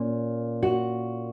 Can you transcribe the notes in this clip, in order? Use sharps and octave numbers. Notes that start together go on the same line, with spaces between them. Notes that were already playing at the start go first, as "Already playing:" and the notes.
Already playing: A#2 A#3 C#4
F#4